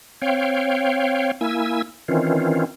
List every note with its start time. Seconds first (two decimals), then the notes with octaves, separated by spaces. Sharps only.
0.22 C4 C#5 F5 G5
1.41 A#3 E4 G#5 E6
2.08 D#3 E3 C4 C#4 F4